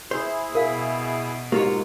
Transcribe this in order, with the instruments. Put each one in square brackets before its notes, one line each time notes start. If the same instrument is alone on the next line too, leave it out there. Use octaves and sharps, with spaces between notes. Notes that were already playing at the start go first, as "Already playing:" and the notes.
[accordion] E4 G#4 [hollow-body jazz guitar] C5
[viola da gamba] B2 [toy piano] A#4 F5
[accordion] G#2 F#3 G#3 [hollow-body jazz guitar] A#3 F4 C#5 [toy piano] G4